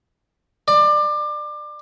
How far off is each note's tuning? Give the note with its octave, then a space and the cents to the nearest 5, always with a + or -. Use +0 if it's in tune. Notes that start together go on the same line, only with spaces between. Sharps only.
D5 +25